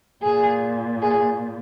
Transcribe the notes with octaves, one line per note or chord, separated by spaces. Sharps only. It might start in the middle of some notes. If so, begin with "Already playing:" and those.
A#2 G#4
G#4